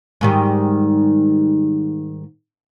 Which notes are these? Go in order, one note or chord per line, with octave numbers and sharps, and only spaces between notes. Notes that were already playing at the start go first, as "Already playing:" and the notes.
G#2 D#3 G3